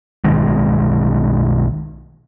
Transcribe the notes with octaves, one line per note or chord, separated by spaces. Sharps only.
B1 D#3 G#3